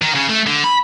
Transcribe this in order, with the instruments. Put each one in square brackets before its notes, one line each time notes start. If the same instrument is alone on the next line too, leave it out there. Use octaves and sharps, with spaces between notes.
[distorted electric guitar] D#3
C#3
A3
D3
B5